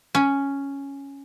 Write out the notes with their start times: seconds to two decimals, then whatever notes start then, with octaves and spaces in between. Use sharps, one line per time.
0.15 C#4